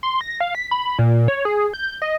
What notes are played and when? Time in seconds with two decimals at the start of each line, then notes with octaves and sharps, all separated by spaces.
0.03 C6
0.21 A#6
0.40 F5
0.55 B6
0.71 B5
0.99 A#2
1.28 C#5
1.45 G#4
1.74 G6
2.02 D#5